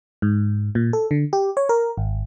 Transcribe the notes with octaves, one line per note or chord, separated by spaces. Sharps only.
G#2
A#2
A4
D3
G4
C#5
A#4
G#1